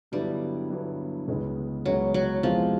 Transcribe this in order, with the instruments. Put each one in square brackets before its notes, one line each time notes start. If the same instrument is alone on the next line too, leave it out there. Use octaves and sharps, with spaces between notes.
[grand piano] G2 D3 F#3 B3 E4 [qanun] G3
[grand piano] G2 D3 F#3 B3 E4
C#2 C#3 E3 G#3 B3
[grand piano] C#2 C#3 E3 G#3 B3 [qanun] F#3
[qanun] F#3
[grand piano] E2 C3 E3 G#3 [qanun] F3